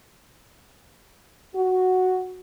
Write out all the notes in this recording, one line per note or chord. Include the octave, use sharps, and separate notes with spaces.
F#4